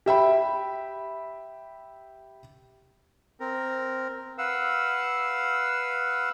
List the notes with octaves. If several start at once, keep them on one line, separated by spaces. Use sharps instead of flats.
G4 E5 G5 B5
C4 A#4
B4 F5 F#5 E6